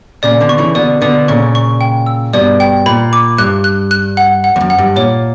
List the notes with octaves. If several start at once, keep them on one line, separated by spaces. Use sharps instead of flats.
A#2 C#3 D5
B2 D3
C#6
C#3 E3
B2 D3 D5
B2 D3 D5
A#2 C#3 C#6
C#6
G5
E6
G2 B2 D5
G5
A#2 B5
D6
G2 F#6
F#6
F#6
F#5
F#5
E2
F#2
F#5
G2
A#2 C#5